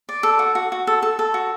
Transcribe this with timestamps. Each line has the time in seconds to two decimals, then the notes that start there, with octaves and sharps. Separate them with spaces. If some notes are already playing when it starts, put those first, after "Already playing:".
0.09 D5
0.23 A4
0.39 F#4
0.55 F#4
0.72 F#4
0.87 A4
1.03 A4
1.19 A4
1.34 F#4